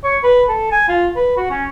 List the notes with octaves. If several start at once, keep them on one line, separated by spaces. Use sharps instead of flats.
C#5
B4
A4
G#5
F4
B4
F#4
C#4